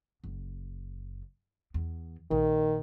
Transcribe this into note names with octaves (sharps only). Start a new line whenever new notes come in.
F#1
E2
A#1 D#3